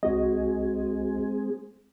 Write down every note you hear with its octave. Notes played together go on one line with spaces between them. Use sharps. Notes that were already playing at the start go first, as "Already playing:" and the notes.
C2 G#3 C4 F#4 G#4 D#5